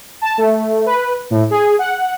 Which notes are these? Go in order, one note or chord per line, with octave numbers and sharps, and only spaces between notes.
A5
A3
B4
A2
G#4
F#5